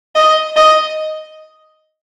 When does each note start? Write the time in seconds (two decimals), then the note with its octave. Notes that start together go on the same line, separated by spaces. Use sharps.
0.15 D#5
0.56 D#5